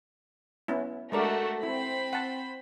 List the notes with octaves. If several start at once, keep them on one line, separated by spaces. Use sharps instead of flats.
B3 C#4 E4
G#3 A3 D4 F#4 A#4 D5
C4 E4 C5 B5
F#5 A5